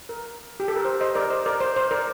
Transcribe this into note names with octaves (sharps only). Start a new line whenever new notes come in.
A#4
G4
A4
A#4
C5
C5 D#5
A#4 D5
C5 D#5
A#4 D5
C5
C5
A#4 D5